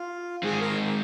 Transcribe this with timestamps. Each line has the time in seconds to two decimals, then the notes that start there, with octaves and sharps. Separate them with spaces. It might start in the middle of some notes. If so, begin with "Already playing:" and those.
Already playing: F4
0.43 D#3 G#3 C4 G#4
0.61 A#4